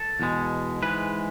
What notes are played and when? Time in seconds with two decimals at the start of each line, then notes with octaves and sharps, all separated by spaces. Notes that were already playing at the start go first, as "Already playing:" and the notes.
Already playing: A4
0.20 E2 B2 G#3
0.82 G#2 E3 G#3 B4